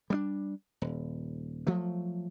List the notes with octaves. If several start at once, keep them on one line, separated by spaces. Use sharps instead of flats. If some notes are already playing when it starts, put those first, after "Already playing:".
G3 A#3 D4
D#1
F3 F#3 A3